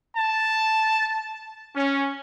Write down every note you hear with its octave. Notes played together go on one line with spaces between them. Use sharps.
A5
C#4